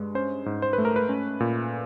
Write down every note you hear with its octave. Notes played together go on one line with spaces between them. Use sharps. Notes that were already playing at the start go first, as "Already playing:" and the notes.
Already playing: G2 G#3
C#4 C5
G#2
C5
B4
A3
A#4
B4
C#4
A#2